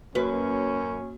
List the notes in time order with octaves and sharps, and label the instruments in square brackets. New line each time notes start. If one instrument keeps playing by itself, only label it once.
[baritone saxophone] F#2 [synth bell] A#3 F#4 [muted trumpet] C#4 [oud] B4